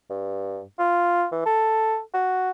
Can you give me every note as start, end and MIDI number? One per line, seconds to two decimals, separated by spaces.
0.10 0.62 43
0.79 1.26 65
1.32 1.43 52
1.46 2.00 69
2.14 2.51 66